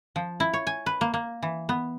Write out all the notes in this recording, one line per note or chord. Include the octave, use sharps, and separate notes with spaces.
F3
E4
C#5
G#5
B4
A#3
A#3
E3
B3